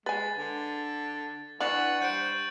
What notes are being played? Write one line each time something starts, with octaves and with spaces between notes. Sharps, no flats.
G#3 B4 G#5 A6
D3
E3 D4 F5 F#5 C#6 A6 F#7
G3 C5 G6 D7